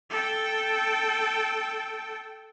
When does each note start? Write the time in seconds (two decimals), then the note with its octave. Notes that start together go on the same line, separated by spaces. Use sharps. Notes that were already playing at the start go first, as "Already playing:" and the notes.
0.10 A4 G5